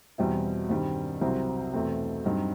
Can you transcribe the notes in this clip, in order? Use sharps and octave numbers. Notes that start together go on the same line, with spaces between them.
E2 B2 G3 C4 E4
G2 D#3 G3 C4
C2 C3 F#3 C4
E2 B2 A3 C4
G2 F#3 C4 D#4